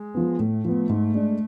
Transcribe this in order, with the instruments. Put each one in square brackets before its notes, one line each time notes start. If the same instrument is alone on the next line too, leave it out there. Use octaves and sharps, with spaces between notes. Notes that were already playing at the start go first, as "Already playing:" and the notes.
Already playing: [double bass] G#3
[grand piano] F3 B3
[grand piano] A2 [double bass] A3
[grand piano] F3 B3
G#2
G#3 D4